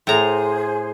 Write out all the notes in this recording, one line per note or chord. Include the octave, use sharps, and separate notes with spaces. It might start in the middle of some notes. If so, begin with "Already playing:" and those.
A2 G#4 C5 A#5